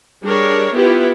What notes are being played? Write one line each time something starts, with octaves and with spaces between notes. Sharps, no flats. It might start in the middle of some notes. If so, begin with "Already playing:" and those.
G3 D4 G#4 A#4 C#5
B3 E4 F4 G4 B4